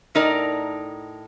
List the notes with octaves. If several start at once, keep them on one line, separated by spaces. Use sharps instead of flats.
A2 D#4 A#4 D5